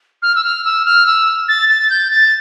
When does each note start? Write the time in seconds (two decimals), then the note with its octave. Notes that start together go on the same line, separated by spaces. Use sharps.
0.22 F6
0.36 E6
0.44 F6
0.65 E6
0.85 F6
1.06 E6
1.48 A6
1.69 A6
1.90 G6
2.11 A6